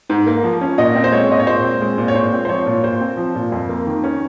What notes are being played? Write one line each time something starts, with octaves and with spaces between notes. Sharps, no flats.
G#2
A#3
F3
C#4
A#2 D#5
C4
C5
G#3 C#5
A#2 D#5
C#5
A#2 C5
C4
G#3
A#2
C#5
A#2 C5
C4
C5
F3 C#5
A#2
A#2 C5
C4
F3
A#2
F2
A#3
D#3
C#4